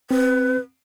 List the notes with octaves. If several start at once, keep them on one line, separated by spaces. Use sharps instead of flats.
C4 B4